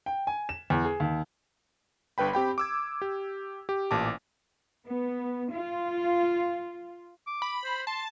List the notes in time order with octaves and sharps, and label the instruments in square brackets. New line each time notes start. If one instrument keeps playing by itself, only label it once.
[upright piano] G5
G#5
E7
E2
G#4
D#2
[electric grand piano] G1 G2 B4 G5 B5
C4 G4 G5 B5
D6 E6 G#6
G4
G4
A1 A#2 A5 D6
[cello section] B3
F4
[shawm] D6
[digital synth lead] B5
[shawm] C5
[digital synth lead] A5 [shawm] C6